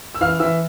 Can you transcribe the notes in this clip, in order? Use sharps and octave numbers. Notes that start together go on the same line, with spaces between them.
E6
E3 F5 F6
E3 E5 E6